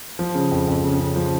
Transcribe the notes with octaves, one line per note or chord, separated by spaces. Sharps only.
F3
C#3
F2
F2
C#3
C#3
F3